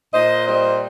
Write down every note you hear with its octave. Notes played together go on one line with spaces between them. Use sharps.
A#2 C5 D#5
G3 C5 D#5